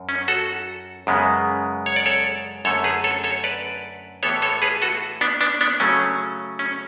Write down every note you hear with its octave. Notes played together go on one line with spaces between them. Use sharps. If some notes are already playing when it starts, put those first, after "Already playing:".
Already playing: F#2
C#4
F#4 A4
F#2 C#3 G#3 B3
C#5
D5
A4 C#5
F#2 D3 A3 A4 C#5
G#4 B4
A4 C#5
A4 C#5
B4 D5
A2 E3 B3 A4 C#5
A4 C#5
G#4 B4
F#4 A4
B3 D4
B3 D4
B3 D4
C#3 F#3 A3 C#4
C#4